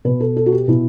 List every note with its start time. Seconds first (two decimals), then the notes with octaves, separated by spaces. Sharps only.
0.05 B2 B4
0.20 A4
0.37 A4
0.46 F#4
0.52 G4
0.68 B2 E4